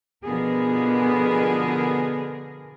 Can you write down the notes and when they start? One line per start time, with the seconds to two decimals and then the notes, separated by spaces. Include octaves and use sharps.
0.25 B2 D3 F3 B3 G#4 A#4